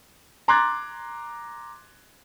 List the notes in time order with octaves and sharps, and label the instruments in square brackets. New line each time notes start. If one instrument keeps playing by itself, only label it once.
[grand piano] A#5 C6 D6 F#6 G#6 A6